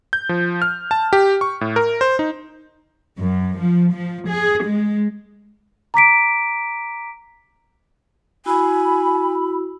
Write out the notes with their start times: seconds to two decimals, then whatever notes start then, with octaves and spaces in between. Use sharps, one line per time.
0.13 G6
0.29 F3
0.62 F6
0.91 A5
1.13 G4
1.41 C#6
1.61 A2
1.76 A#4
2.01 C5
2.19 D#4
3.19 F#2
3.58 F3
3.92 F3
4.29 G#4
4.64 G#3
5.94 A#5 D6 B6 D7
8.46 E4 F#4 G#5 B5 E6